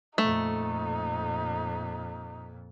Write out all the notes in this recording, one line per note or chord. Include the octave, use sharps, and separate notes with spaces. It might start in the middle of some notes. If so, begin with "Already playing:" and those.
F2 A#2 A3 D#4